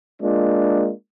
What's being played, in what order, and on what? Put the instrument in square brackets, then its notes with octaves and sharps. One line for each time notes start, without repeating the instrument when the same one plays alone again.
[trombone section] G#3 A#3 D4 F4